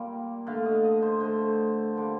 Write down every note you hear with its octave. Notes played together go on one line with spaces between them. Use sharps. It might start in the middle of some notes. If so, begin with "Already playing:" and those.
Already playing: A#2 G3 A#3
D3 A3 F5
D#5
D#5
C5
D3 A3 C5
D3 G3 A#3